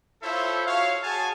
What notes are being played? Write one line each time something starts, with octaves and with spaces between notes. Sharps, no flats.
E4 F4 A4 C5 C#5 E5
F#4 C#5 F5
F#4 G#4 G#5 A5